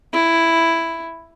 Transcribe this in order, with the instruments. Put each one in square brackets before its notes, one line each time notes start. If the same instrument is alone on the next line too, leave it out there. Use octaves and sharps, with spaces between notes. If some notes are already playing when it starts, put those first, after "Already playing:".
[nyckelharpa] E4